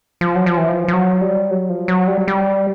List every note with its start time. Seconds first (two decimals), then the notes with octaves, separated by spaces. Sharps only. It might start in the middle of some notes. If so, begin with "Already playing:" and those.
0.21 F3
0.35 F#3
0.46 F3
0.57 E3
0.69 F3
0.88 F3
0.93 F#3
1.21 G3
1.51 F#3
1.69 F3
1.88 F#3
2.08 G3
2.28 G3